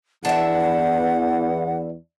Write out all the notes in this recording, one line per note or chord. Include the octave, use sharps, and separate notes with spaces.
E2 E3 B3 D4 E4 E5 F#5